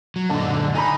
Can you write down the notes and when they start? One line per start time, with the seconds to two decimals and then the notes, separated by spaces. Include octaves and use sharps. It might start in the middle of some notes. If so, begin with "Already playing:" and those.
0.16 F#3
0.30 F#2 A#2 D3 D#4 A5
0.75 D#4 G#5 A#5 B5